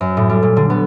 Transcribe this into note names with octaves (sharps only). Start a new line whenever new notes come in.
F#2
A2
G3
A#2
D3
B3